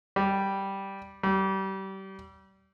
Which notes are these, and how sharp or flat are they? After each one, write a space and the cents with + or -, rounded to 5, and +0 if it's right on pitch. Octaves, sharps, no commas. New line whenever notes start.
G3 -5
G3 -30